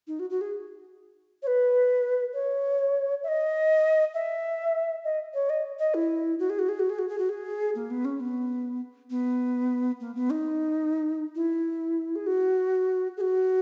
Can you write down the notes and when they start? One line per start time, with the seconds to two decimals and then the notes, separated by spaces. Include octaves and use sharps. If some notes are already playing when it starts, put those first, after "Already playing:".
0.07 D#4
0.19 F#4
0.30 F#4
0.41 G#4
1.43 C#5
1.47 B4
2.33 C#5
3.23 E5
3.28 D#5
4.14 E5
5.04 D#5
5.34 C#5
5.50 D#5
5.79 D#5
5.94 E4
6.39 F#4
6.50 G#4
6.59 F#4
6.69 G#4
6.79 F#4
6.90 G#4
6.99 F#4
7.09 G#4
7.18 F#4
7.29 G#4
7.75 A#3
7.90 B3
8.05 C#4
8.20 B3
9.10 B3
10.00 A#3
10.15 B3
10.30 D#4
11.35 E4
12.15 G#4
12.26 F#4
13.17 G#4
13.21 F#4